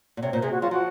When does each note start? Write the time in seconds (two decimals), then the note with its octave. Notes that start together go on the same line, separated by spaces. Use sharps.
0.17 A#2
0.22 C3 C#5
0.32 A#2 C5
0.42 C3 G#4
0.52 F#4
0.61 F#3 F4
0.71 F3 F#4